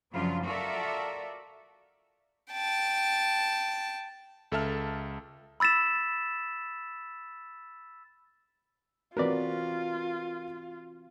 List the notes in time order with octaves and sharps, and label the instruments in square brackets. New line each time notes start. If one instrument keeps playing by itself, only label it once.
[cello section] F#2 C#3 F3 F#3 D4 F4
F4 F#4 A4 A#4 D5 E5
[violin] G5 A5
[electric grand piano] C#2 A4 E5 A5 F6
[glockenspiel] B5 E6 A6 B6 E7
[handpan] E3 C4 F#4 [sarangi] F4 [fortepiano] A#4 B4 D5